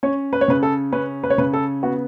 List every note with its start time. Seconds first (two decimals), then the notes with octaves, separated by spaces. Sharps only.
0.03 C#4 C#5
0.33 B4
0.41 C#5
0.48 C#3 B4
0.63 A4
0.92 C#4 B4
1.23 B4
1.30 C#5
1.38 C#3 B4
1.53 A4
1.83 B3 F#4